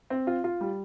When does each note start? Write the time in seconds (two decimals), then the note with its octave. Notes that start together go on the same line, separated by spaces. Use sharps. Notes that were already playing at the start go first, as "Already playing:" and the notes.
0.10 C4
0.27 F4
0.44 F4
0.61 G3